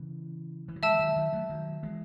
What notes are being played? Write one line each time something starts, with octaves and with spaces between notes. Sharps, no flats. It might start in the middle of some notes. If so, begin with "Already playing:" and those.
Already playing: C#3 E3
E3
F#3
E3 G#3 E5 A5 E6
E3
D#3 F#3
D#3 F#3
F#3 A3
D#3 F#3
E3 G#3